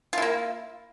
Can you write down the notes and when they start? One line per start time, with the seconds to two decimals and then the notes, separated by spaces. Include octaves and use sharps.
0.13 F4
0.18 E4
0.22 A#3